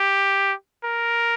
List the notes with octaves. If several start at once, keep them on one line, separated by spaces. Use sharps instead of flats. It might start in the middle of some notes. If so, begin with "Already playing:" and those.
Already playing: G4
A#4